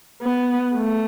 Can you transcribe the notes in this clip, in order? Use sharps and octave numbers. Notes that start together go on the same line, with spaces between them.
B3
A3